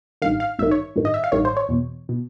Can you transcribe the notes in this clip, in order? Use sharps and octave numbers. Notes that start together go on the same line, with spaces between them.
A1 G2 D#3 F5
F5
A1 G2 D#3 E5
C#5
A1 G2 D#3
D#5
E5
F5
A1 G2 D#3 C#5
C5
C#5
E2 B2
B2